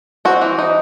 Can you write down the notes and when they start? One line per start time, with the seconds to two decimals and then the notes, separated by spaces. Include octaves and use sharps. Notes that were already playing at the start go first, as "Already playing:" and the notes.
0.25 C4 F#4
0.41 E3
0.59 D#4